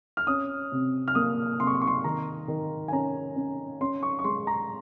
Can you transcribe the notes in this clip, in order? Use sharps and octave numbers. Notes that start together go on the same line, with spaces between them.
F6
C#4 D#6
C3
F6
A#3 D#6
C3 C6
C#6
C6
C#6
C6
D#3 A#5
D#3
G#5
C#4 A#5
C#4
C#4 C6
C#6
C#6
G#3 C6
A#5